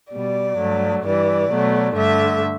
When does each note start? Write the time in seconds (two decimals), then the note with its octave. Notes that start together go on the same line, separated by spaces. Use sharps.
0.13 B2 G3 D5
0.59 G2 F#3 A3
1.05 G2 E3 G3 D5
1.51 B2 F#3 A3
1.96 G2 D3 A3 E5